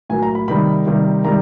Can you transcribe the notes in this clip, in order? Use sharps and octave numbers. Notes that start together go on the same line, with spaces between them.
A2 F#3 A#3 G#5
A#5
B5
C3 D#3 G3 A#3 B5
C3 D#3 G3 A#3
C3 D#3 G3 A#5